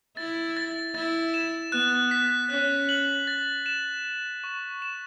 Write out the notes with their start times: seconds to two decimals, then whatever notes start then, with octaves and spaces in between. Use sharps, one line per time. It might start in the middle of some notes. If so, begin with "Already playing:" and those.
0.17 E4 A6
0.57 A6
0.95 E4 A6
1.34 E7
1.72 B3 F#6
2.11 B6
2.50 C#4 F#6
2.89 F#7
3.27 A6
3.66 E7
4.05 A6
4.44 C#6
4.82 E7